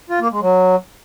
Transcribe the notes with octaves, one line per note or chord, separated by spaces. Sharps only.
F4
A#3
G#3
F#3